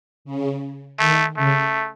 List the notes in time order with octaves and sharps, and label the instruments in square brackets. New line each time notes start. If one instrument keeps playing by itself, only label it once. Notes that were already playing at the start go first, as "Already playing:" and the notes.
[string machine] C#3
[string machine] D#3 [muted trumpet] A3
[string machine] C#3 [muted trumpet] A3